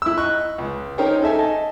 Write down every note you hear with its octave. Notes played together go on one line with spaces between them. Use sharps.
E4 E6
D#5 C#6 F#6
C#2
C#4 D#4 A#4 C5 C#5 G5
D#4 A4 E5 G#5
D#5 A5